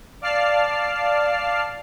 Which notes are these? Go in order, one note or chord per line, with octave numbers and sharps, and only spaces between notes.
D5 F5 A5 F6 C7